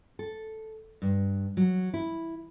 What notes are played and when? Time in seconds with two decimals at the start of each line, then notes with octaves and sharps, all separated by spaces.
0.19 A4
1.02 G2
1.57 F#3
1.94 E4